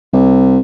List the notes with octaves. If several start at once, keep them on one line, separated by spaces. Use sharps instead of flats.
C2